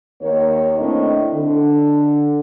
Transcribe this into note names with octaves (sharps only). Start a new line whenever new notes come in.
D#2 A#3 C#5
A2 C4 D4 D#5
D3